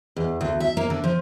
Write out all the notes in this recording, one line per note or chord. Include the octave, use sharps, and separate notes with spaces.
E2
D2
E5
A#3
D3
F3